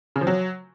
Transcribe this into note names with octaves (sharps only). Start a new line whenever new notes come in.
C#3
F3
F#3